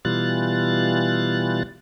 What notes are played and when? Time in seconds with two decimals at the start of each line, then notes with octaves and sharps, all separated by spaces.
0.05 B2 E3 G3 F4 F#6 A6